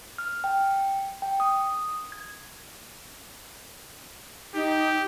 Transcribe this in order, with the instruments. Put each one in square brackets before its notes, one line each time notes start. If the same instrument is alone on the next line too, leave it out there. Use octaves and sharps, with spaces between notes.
[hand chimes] F6
G5
G5
D#6
G#6
[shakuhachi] D#4 [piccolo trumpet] G4